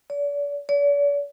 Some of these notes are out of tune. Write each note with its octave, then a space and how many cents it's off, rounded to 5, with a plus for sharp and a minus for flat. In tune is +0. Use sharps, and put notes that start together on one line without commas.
D5 -40
D5 -45